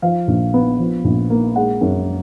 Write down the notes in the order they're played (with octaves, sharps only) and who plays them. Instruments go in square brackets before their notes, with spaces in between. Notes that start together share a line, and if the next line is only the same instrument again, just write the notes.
[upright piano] F3 F5
A#1
B3
F3
A#1
A#3
G#3 F#5
F#2